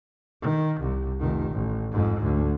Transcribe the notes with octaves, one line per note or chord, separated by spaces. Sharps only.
D#3
C2
F1 D#3
A1
F2 G#2
D2